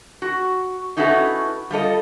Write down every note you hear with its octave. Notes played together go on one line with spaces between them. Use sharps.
F#4
C#4 D#4 E4 F#4 A4 B4
G3 F4 A4 D#5